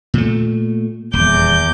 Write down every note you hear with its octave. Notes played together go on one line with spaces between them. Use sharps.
A#2 A3
D#1 E2 D6 G6